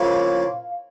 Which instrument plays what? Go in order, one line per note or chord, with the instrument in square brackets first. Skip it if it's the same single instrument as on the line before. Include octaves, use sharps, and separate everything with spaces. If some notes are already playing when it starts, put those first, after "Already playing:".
Already playing: [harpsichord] C#3 F3 A#3 E4 [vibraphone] F5